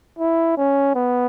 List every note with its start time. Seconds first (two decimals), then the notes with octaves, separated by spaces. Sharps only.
0.19 E4
0.57 C#4
0.95 B3